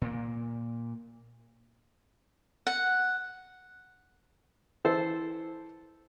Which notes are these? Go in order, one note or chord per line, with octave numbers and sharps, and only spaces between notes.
A#2 A#3
F#5
E3 A4 C5